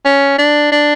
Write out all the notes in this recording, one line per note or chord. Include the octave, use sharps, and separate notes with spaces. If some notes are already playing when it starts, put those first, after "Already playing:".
C#4
D4
D4